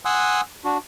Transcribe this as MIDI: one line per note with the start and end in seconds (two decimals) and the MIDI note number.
0.05 0.41 78
0.05 0.41 80
0.05 0.41 84
0.05 0.41 87
0.05 0.41 88
0.05 0.41 90
0.65 0.78 62
0.65 0.78 66